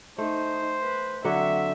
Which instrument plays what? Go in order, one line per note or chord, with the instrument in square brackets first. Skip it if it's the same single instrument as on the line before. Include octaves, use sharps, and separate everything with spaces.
[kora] A3 [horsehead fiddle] D#4 [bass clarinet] C5
[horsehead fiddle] B4
[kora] D3 F#3 C#5 [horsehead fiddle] C4 E5